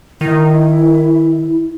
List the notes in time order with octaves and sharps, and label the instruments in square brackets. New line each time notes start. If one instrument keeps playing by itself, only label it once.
[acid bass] D#3 [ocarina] E4